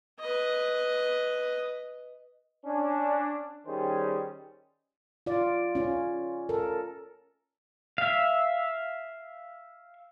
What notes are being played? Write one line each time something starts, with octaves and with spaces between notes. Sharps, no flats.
B4 D#5
C#4 D4
D#3 G3 C#4 G#4 C5
F4 D5
C#4 F4
A4 A#4
E5 F5